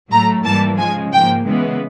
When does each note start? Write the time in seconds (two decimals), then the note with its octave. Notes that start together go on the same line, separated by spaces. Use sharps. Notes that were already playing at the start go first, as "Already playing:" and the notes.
0.11 A2 F#3 A3 A#5
0.45 G#2 E3 G3 A#3 A5
0.78 C#3 F3 G#3 G#5
1.13 G#2 F3 A#3 G5
1.46 C#3 E3 G#3 B3